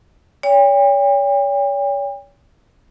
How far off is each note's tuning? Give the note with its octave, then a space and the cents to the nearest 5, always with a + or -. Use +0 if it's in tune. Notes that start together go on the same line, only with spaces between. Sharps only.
C#5 +40 G5 +40